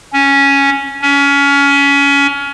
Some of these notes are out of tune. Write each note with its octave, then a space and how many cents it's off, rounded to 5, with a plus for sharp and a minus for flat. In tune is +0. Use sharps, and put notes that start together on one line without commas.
C#4 +0
C#4 +25